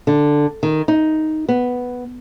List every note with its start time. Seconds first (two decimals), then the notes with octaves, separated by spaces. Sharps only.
0.07 D3
0.63 D#3
0.88 D#4
1.49 B3